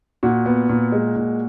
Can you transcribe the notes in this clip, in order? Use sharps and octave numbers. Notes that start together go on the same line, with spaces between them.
A#2 F#4
B3
A#2
G#3
A#2